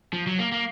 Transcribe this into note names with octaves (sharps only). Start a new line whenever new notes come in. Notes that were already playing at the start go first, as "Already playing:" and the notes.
F3
F#3
A#3
A#3